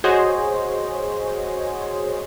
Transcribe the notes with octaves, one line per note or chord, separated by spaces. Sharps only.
F#4 G#4 C5 C#5 D#5